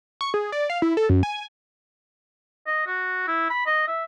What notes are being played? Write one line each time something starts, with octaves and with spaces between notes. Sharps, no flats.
C#6
G#4
D5
F5
E4
A4
F#2
G#5
D#5
F#4
E4
B5
D#5
E5